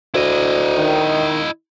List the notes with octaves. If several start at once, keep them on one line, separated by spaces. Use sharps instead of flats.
D2 E4 D#5
D#3